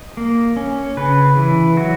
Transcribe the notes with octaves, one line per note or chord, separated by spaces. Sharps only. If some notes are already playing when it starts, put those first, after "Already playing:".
Already playing: D#5
A#3
C#4
C#3 B4
E3
F#3 F#4